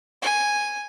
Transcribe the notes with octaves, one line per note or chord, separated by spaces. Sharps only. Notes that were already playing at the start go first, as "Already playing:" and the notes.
G#5